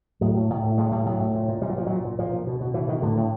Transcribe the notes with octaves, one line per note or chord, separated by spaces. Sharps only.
A2 F#3
A2
A2
A2
A2 G#3
A2 G3
A2 F#3
A2
A#2
A#2
A#2 G3
F#3
A#2 F3
A#2 F#3
A#2
A#2 F3
A#2
B2
B2
B2 E3
B2 D#3
A2 D3
A2